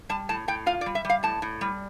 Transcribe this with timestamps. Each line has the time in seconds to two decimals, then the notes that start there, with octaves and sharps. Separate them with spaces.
0.09 G3 A5
0.29 A2 A5
0.48 A2 G5
0.66 F4 F5
0.81 D5
0.86 G3
0.95 E5
1.05 G3 F5
1.23 A2 A5
1.42 A2
1.61 G3